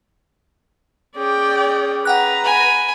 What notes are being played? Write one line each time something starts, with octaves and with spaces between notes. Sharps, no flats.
C#4 G#4 D5 G5
B4 F#5 G5 A#5 F#6
G#5 B5